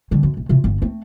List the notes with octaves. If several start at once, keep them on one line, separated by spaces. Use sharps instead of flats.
D3 G3
F#2
B1
C3 F4
G1
A3 C4